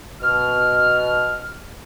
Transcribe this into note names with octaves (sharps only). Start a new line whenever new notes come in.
B2 F6